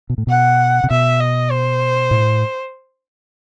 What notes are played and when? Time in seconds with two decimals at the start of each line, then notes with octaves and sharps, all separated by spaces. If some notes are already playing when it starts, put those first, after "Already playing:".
0.10 B2
0.18 A2
0.27 B2 F#5
0.84 C3
0.90 B2 E5
1.20 D#5
1.51 C5
2.11 A2